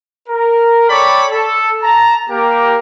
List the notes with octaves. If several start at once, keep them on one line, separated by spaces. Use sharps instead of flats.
A#4
A4 C#5 D5 G5 B5 C#6
A4
A5 A#5
A#3 G4 A#4